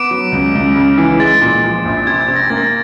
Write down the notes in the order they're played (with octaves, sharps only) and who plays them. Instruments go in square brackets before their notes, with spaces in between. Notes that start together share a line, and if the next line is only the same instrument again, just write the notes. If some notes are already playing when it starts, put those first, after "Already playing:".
Already playing: [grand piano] B3 [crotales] D6 D7
[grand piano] F#3
C#2
C#2
C#3
E3
[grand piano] G#3 [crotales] A6
[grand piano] A#2
F3
A#1
[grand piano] C3 [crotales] G#6
[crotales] G#6
[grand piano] C3
[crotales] A#6
[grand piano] A#3 [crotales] A6